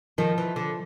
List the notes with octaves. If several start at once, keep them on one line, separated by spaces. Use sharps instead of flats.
D#3 F3
E3
D3